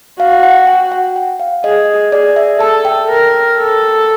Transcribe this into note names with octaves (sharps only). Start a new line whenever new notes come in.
F#4 F5
F#5
G5
F#5
G5
F5
G#4 D#5
G#4 D5
E5
A4 A5
G5
A#4
A4